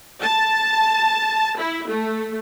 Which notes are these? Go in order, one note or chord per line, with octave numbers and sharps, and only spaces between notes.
A5
E4
A3